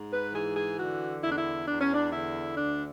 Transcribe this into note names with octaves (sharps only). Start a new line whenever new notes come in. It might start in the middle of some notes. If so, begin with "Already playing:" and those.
Already playing: G#2
B4
E3 G#4
G#4
D3 F#4
E2 E4
D4
E4
E2 D4
C#4
D4
D3 E4
D2 D4